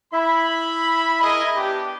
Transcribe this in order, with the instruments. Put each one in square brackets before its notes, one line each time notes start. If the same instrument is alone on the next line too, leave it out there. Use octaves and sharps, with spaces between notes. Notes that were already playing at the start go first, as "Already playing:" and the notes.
[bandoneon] E4 E5 [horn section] B5
[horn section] G#4 A#4 D#5
B3 D4 G4